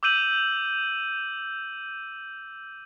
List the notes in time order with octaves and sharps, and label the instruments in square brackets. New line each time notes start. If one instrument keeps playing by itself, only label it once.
[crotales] D6 E6 G6 D#7 F#7